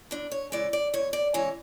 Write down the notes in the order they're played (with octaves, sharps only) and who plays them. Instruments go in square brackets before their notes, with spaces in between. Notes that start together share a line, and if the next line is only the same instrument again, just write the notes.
[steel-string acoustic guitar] E2 D4
C#5
C#3 E3 G#3 D5
D5
E2 C#5
D5
C#3 E3 G#3 C#5